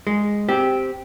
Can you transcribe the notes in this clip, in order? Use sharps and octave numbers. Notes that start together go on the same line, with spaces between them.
G#3
C4 G4